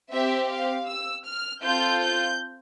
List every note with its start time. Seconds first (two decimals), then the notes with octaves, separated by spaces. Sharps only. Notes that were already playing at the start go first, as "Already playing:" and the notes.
0.12 C4 G4 E5
0.50 F5
0.89 E6
1.26 F6
1.64 C4 F4 A4 G6
2.02 G6